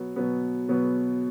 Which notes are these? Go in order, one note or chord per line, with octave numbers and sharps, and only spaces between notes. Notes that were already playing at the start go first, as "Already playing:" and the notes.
Already playing: B2 F#3 B3
B2 F#3 B3
B2 F#3 B3